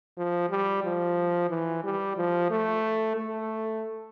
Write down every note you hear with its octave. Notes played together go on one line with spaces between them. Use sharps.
F3
G3
F3
E3
G3
F3
A3
A3